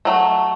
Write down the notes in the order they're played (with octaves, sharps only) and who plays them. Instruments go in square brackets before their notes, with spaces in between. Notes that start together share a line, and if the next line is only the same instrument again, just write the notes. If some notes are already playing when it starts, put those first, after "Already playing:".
[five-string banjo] F#3 A3